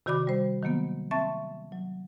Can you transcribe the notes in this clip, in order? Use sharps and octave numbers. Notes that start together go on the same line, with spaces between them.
C3 D#3 F#4 D5 B5 D6
G3 C5
D#3 F#3 A#3 B3
C4 E5 A5 C#6 A6
F#3